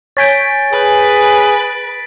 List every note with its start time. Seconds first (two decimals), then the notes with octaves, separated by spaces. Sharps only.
0.17 C#5 G#5 G6 A6 B6 D7
0.73 G#4 B4